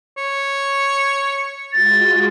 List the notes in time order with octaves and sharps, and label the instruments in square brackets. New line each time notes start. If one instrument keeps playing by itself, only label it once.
[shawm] C#5
[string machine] G#3 F4 F#4 [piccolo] A6